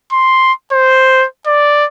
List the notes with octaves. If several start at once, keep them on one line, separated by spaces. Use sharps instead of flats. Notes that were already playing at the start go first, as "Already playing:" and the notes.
C6
C5
D5